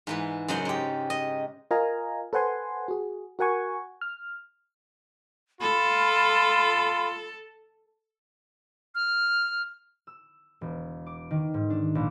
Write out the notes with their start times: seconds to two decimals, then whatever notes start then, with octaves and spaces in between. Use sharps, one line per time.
0.07 G#2 E3 B4
0.48 F#2 C#3 C5 D#5 F#5 C6
0.65 G#2 G4
1.10 D#5
1.71 F4 A#4 D#5 F5 G#5 A#5
2.33 A4 B4 C5 F#5 G#5 C6
2.88 F#4 G#4
3.39 F#4 A#4 F#5 G#5 C#6
4.01 F6
5.61 F4 A4 B5
8.95 F6
10.07 E6
10.61 E1
11.06 D6
11.31 D#3
11.54 G#2
11.70 D4
11.95 A#1